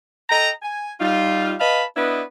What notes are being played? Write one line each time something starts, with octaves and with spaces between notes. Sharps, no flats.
A4 D#5 G5 A#5
G#5
G3 D#4 F4
B4 D#5 F5 A5 B5
B3 D4 E4 B4 D#5